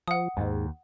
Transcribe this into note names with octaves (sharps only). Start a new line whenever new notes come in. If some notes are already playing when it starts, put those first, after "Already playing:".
F3 F#5 D#6
D#2 G#2